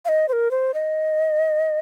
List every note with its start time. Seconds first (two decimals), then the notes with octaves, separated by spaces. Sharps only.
0.05 F5
0.09 D#5
0.28 C5
0.33 A#4
0.51 C5
0.74 D#5